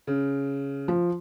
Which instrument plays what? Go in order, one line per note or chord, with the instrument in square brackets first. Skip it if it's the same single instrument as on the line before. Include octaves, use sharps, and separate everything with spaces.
[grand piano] C#3
[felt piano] F3